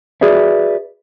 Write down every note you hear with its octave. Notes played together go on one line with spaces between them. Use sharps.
F#4 G#4 B4 D5 E5